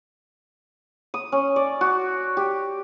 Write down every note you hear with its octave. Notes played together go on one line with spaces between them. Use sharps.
D#6
C#4
D5
F#4
G4